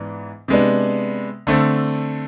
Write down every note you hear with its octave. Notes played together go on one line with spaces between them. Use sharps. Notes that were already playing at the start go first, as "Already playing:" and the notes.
Already playing: G#2 E3 B3 D4
C3 G#3 B3 D4
D3 A3 C4